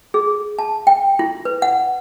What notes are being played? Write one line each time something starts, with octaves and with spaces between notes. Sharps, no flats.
G#4
A5
G5
E4
B4
F#5